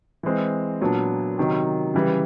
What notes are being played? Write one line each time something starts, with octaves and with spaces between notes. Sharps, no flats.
E3 G#3 C4
A#2 F#3 B3 D4
C3 D#3 F#3
C#3 E3 G3